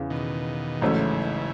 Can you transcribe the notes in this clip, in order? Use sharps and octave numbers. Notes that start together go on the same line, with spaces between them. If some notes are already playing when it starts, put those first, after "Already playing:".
Already playing: E2 C#3 E3
B2 D#3
A1 G#2 C#3 E3 F#3 A3 C#4